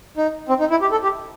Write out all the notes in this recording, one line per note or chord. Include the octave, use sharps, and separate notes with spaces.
D#4
C4
D#4
E4
G4
A4
G4